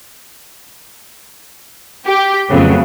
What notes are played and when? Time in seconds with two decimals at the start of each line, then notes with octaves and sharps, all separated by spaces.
2.06 G4
2.50 F2 C#3 F#3 A3 B3